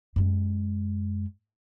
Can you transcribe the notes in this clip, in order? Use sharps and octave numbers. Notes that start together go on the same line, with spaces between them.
F#2 G#3